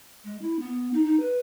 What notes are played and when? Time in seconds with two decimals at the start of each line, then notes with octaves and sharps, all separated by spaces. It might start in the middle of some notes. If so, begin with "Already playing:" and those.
0.24 G#3
0.42 E4
0.60 B3
0.94 D#4
1.05 D#4
1.20 B4